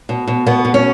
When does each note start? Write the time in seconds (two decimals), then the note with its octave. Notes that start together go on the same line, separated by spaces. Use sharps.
0.09 B2
0.27 B2
0.46 B2 B3
0.65 B2
0.74 C#4